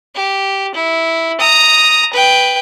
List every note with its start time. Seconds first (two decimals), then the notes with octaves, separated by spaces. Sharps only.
0.15 G4
0.75 E4
1.39 A#5 D#6
2.13 B4 G5